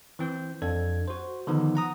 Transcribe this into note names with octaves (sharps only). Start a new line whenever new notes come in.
E3 C4 G6
F2 D4 A4 G#6
F#4 C5
D3 D#3 F3 B3 D#4
F#5 A#5 D#6